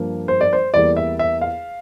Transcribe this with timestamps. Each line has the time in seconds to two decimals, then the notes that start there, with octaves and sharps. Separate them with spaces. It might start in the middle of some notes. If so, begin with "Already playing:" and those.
Already playing: G2 F3 A#3
0.28 C5
0.41 D5
0.53 C5
0.74 E2 E3 G3 A#3 D5
0.97 E5
1.19 E5
1.41 F5